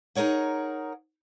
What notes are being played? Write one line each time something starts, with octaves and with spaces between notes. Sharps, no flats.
D#4 G#4 A#4 C#5 F#5